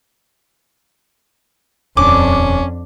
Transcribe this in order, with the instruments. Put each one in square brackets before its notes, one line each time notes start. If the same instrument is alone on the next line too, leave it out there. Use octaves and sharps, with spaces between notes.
[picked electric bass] D#1 [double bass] F2 D4 [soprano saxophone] C#4 [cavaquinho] D6